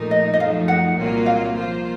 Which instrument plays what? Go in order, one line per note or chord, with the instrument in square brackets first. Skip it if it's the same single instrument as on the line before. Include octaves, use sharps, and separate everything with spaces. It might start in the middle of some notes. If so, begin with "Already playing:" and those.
Already playing: [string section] A#2 F3 A3 D#4 A#4
[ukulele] D#5
D#5
[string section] F#2 F3 A3 D#4 [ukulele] F5
[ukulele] F#5
[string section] C2 A#2 F#3 A#3 F4
[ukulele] F5
[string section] F3 A#3 F4 C5